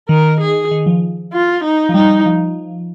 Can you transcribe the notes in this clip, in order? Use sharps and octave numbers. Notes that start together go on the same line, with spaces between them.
D#3 A#4
G#4
D#3
F3
F4
D#4
F3
G3 D#4
F3